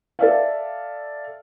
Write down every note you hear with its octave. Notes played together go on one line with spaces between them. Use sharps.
A4 D5 E5 F5